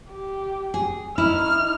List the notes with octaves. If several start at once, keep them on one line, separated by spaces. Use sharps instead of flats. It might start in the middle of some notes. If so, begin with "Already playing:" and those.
G4
G#4
D#4 E4 F6